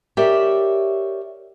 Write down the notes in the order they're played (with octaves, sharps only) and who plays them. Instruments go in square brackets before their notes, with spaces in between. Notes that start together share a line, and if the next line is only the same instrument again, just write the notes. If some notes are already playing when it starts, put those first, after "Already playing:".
[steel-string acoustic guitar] G4 A#4 C#5 D5 E5